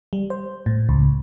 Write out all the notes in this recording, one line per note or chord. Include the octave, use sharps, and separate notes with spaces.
G3
C5
A2
C#2